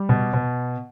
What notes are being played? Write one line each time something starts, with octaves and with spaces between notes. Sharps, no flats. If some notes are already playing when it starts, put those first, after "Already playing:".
Already playing: G3
B2
B2